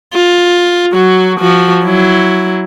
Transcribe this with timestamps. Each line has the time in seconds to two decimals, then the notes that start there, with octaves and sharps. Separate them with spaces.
0.14 F4
0.93 F#3 F#4
1.40 F3 F#4
1.85 F#3 E4